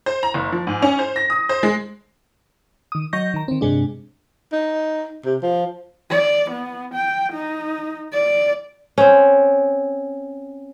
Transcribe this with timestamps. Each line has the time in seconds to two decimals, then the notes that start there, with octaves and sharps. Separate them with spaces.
0.06 C5
0.23 A#5
0.34 F#1
0.52 F3
0.67 G#2
0.82 C#4
0.99 C5
1.16 A#6
1.30 D#6
1.49 C5
1.63 G#3
2.92 D#3 D#6
3.13 F#3 D#5 C#6 G6 A#6
3.34 D#3 A#5
3.48 D#3 C4
3.61 G2 C3 G#3 D4
4.52 D#4
5.26 C3
5.43 F3
6.10 D5
6.51 B3
6.94 G5
7.32 D#4
8.12 D5
8.98 C4 C#4